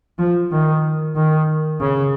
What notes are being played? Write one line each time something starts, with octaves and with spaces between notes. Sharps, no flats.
F3
D#3
D#3
C#3